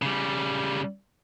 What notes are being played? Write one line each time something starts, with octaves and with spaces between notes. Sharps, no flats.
C#3 G3